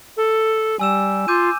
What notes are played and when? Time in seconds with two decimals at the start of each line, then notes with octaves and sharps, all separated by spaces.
0.17 A4
0.79 G3 G#5 E6 E7
1.28 F4 D6 G6 D#7